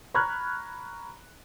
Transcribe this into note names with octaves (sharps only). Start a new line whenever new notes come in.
A#5 B5 C#6 F6 F#6 G#6